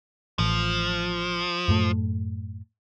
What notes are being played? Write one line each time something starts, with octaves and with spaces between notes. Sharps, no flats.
A1 F3
F#2 A2 A3